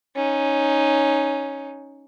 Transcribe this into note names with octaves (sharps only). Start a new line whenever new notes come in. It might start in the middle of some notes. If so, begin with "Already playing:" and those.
C#4 D#4